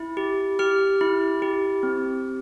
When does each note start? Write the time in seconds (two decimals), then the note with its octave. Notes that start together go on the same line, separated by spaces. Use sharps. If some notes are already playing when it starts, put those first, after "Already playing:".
Already playing: E4
0.17 G4
0.59 G4 F6
1.01 E4
1.42 G4
1.83 C4